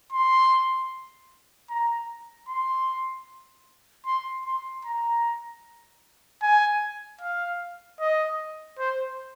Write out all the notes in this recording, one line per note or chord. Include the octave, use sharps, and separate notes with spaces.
C6
A#5
C6
C6
C6
A#5
G#5
F5
D#5
C5